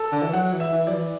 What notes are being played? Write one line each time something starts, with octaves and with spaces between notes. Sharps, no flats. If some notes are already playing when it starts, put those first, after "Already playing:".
Already playing: A4
D3
E3
F#3 F#5
E3
E5
E3
F#3 D5
E3